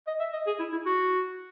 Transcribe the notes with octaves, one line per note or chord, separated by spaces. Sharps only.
D#5
E5
D#5
G#4
E4
E4
F#4